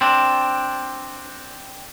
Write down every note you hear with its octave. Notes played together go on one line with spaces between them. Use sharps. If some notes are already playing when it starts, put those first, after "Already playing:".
C4 D4